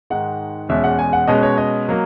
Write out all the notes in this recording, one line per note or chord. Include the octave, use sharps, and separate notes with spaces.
G#2 D#3 G#3 F#5
E2 B2 G#3 C#4 E5
F#5
G#5
F#5
B2 G#3 C#4 D#5
C#5
D#5
F#3 A#3